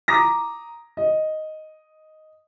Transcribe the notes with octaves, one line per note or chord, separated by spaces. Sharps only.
A#5 D6 D#6 A#6
D#5